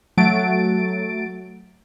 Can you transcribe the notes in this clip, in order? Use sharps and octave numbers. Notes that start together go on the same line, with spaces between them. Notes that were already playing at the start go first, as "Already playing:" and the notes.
F#3 A3 A6 D7